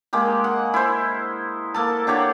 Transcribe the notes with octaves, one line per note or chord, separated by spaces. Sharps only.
G#3 A#3 G4
F#5
E4 C5
A#3 A4 A5
D4 G4 C#5 F#5